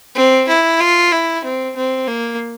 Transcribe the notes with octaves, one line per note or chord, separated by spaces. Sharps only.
C4
E4
F4
E4
C4
C4
A#3